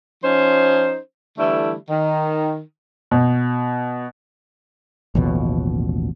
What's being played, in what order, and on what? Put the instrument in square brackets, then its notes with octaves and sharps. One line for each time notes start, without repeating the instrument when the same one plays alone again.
[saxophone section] F3 C#4 D#4 C5
D3 E3 G3 A3 E4
D#3
[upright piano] B2
[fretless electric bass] A1 D#2 B2 F3